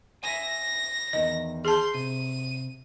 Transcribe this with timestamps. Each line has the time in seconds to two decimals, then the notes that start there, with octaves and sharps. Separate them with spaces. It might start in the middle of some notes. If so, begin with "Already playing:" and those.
0.24 E5 G#5 A#6
1.13 E2 D#3 D#5
1.65 G#4 A5 C6 G6
1.94 C3 D#7